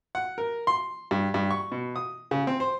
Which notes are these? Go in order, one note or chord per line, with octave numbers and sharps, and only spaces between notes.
F#5
A#4
C6
G2
G2
C#6
B2
D#6
C#3
C4
C5